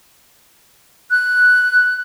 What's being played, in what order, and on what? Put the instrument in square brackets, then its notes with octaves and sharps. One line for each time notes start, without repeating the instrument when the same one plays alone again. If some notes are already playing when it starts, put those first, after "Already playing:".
[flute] F#6